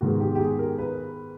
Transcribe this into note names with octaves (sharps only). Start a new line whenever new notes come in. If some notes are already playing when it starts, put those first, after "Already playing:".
G#2 D#3 G#3 B3 F#4
G4
G4
G#4
A#4
B4